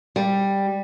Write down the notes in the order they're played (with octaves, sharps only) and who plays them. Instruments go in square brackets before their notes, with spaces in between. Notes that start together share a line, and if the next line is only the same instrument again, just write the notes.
[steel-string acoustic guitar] G3